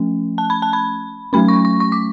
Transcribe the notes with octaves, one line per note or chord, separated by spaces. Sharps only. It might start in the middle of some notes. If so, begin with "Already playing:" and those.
Already playing: F3 A3 C#4
A5
B5
A5
B5
F#3 A3 C#4 B5
C#6
C#6
C#6
D6